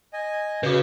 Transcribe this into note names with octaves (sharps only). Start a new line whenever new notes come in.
D#5 G#5
C#3 F#4 B4